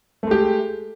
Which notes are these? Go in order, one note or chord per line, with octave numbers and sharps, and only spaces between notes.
G#3 A3 G4